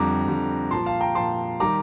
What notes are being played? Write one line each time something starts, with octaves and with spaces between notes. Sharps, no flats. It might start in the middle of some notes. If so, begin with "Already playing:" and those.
Already playing: F2 D3 G3 A#5 D6
F2 D3 G3
A#2 F3 A5 C6
F5 A5
G5 A#5
A#2 F3 A5 C6
D#3 G3 A#5 D6